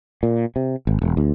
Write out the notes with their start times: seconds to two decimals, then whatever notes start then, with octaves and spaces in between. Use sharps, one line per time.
0.23 A#2
0.56 C3
0.87 G#1
1.02 E1
1.17 D2